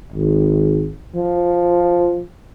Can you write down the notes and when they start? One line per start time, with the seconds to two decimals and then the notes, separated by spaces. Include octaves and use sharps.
0.13 G#1
1.16 F3